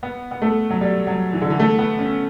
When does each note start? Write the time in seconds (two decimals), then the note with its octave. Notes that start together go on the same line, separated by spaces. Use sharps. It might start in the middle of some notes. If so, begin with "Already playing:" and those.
0.03 B3
0.31 B3
0.42 A3
0.70 F#3
0.81 G3
1.07 F#3
1.33 E3
1.42 D3
1.50 E3
1.60 A3
1.79 B3
1.99 C#4